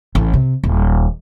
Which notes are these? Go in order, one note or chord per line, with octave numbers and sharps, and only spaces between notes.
A1
C3
D#1